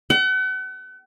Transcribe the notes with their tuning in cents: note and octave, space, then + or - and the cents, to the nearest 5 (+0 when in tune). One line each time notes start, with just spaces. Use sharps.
F#5 +40